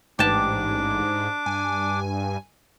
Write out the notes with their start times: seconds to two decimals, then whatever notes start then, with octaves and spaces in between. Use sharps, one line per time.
0.19 A1 G#2 D4 G4 A5 D6
1.46 G2 G#5